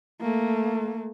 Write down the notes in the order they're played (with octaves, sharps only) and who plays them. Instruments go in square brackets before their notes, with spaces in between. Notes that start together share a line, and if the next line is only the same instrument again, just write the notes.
[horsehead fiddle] A3 A#3